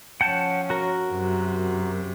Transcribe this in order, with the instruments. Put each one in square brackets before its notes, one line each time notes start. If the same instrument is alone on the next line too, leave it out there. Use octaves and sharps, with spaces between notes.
[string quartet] F3 C#4 [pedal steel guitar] F#5 G5 A5
[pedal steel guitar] F#4 A#4
[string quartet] F#2 C3